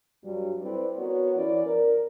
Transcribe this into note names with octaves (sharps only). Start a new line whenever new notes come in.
G2 F#3 G3
C4 E4 A4 B4 C5 D5
B3 F#4 A#4 C#5
E3 C#4 E4 D5
A#4